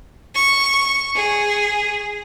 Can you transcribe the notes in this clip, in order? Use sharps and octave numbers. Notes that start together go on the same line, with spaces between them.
C#6
G#4